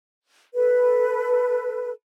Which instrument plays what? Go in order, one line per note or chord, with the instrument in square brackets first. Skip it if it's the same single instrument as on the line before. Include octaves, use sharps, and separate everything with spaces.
[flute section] A4 B4